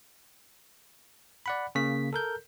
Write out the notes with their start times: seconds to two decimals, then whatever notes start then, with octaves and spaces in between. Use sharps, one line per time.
1.46 D5 F#5 B5
1.75 C#3 A#3 B6
2.13 A4 A#4 G6